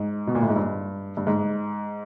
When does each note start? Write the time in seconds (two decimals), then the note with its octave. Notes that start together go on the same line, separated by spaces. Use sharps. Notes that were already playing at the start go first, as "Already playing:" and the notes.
Already playing: G#2
0.27 B2
0.35 A#2
0.42 A2
0.49 G#2
0.56 G2
1.17 G2
1.27 G#2